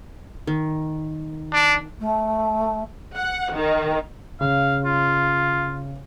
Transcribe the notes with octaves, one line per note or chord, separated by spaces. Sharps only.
D#3
D4
A3
F#5
D#3
C#3 F5
F4